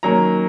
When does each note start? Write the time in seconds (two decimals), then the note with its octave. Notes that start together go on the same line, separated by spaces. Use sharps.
0.03 D#3 F#3 A#3 C#4 A#5